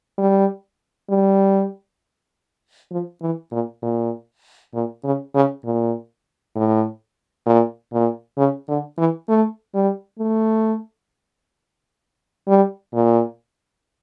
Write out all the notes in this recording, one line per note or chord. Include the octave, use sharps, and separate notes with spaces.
G3
G3
F3
E3
A#2
A#2
A#2
C#3
C#3
A#2
A2
A#2
A#2
C#3
D3
E3
A3
G3
A3
G3
A#2